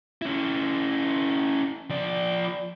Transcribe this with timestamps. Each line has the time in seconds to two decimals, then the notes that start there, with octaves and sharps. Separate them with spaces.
0.22 C#4 E4
1.90 F3 D5